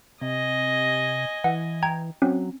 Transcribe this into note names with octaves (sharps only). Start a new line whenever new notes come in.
C3 D#5 G#5
E3 F#5
G5 A#5 G#6
F#3 C4 C#4